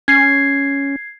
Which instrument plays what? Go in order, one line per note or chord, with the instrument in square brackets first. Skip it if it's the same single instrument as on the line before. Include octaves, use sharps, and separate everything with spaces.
[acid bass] C#4 [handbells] G#6 C7